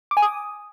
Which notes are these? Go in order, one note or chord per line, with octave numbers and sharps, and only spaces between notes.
D6
G#5
D#6